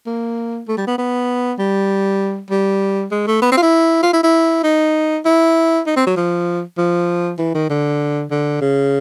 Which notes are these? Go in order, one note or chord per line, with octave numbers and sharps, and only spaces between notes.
A#3
A3
G3
B3
B3
G3
G3
G#3
A3
B3
C4
F4
E4
F4
E4
E4
D#4
E4
D#4
C4
F#3
F3
F3
E3
D#3
D3
D3
C#3